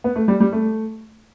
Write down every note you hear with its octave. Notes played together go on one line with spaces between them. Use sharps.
B3
A3
G3
G3
A3